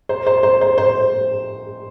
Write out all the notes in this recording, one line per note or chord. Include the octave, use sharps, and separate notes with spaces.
C5
C5
C5
C5
C5